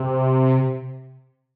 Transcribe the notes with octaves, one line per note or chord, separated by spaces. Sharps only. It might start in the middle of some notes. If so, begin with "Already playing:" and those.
Already playing: C3